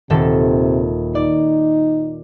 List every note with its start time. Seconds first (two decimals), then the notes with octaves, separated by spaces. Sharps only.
0.10 D#1 C3 A4
1.15 D#4 D5